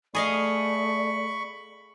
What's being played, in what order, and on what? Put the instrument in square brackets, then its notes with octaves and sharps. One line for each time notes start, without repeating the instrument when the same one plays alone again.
[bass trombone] A3 [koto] G#4 D#5 F5 [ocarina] D5 [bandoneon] B5 C#6